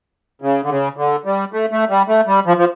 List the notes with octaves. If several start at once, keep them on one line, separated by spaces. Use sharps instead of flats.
C#3
D3
C#3
D3
G3
A3
A3
G3
A3
G3
F3
F3